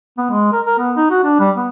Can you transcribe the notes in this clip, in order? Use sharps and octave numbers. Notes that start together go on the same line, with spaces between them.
B3
G#3
A#4
A#4
B3
D#4
F#4
D4
G3
B3